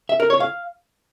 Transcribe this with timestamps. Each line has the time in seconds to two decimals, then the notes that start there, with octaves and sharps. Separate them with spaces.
0.09 E5
0.20 A#4
0.30 C#5
0.40 F5